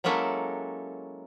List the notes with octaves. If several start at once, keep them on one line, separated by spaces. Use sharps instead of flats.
F#3 G#3 A#3 C#4 E4 A4